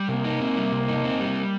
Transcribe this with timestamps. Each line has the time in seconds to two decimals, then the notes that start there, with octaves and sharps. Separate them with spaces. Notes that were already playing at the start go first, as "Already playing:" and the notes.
Already playing: G3
0.08 C3 A#3
0.25 D#4
0.40 C4
0.56 G3
0.72 C3
0.88 D#4
1.05 C4
1.20 G3